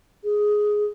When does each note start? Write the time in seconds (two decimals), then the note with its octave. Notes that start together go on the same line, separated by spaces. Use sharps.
0.24 G#4